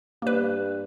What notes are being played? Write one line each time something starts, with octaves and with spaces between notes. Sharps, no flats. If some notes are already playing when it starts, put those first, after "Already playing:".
G2 A#3 B4